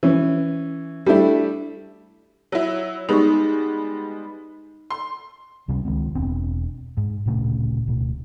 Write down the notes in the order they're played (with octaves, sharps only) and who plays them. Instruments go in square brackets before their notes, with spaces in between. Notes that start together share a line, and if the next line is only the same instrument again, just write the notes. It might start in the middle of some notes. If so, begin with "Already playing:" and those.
[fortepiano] E3 C#4
G3 A3 D4 E4
[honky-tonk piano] F#3 E4
[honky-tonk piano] G3 G#3 B3 [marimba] D#4 C#6
[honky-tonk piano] C6
[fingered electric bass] C#2 C3 G3 C#4
C#2 D#3 G#3 C4
E1 B3 C4 D4
G#2
D1 A#2 C#3 A3
D1 B2 A3